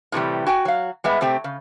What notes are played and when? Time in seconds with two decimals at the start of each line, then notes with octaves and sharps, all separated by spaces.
0.12 A2 C3 E3 G3
0.47 F#4 G5 G#5
0.65 F#3 F5
1.04 G3 G#3 B3 E5
1.21 C3 A3 C4 G4
1.44 C#3